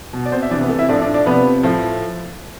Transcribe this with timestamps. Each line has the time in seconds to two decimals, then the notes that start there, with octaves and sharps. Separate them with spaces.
0.13 B2
0.26 D5
0.32 C4 C5
0.42 E5
0.51 C3 E3 D4 D5
0.61 B3 B4
0.69 A3 A4
0.79 E4 E5
0.89 A2 F3 D4 D5
1.01 D4 D5
1.14 D4 D5
1.26 C3 F3 B3 B4
1.63 A2 F3